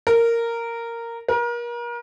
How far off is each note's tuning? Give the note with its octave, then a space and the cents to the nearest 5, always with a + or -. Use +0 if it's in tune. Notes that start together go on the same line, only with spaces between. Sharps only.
A#4 -10
A#4 +35